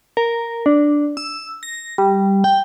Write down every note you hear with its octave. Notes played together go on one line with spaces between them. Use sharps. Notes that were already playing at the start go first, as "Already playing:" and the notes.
A#4
D4
E6
A#6
G3
G5